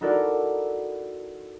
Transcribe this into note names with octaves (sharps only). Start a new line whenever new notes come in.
D#4 E4 F#4 A4 A#4 D5